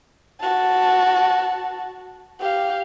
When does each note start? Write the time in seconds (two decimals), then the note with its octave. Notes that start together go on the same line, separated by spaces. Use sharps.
0.41 F#4 A5
2.40 G4 F5